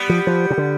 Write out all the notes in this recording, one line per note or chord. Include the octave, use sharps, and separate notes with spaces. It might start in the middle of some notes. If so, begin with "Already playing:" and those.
Already playing: G3 B3
F3
F3
C3
D3